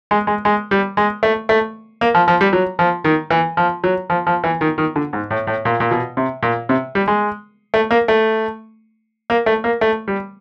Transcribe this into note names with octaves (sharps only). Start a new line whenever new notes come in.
G#3
G#3
G#3
G3
G#3
A3
A3
A#3
F3
F3
G3
F#3
F3
D#3
E3
F3
F#3
F3
F3
E3
D#3
D#3
D3
G#2
A2
A2
A#2
A#2
B2
C3
A#2
C3
G3
G#3
A3
A#3
A3
A#3
A3
A#3
A3
G3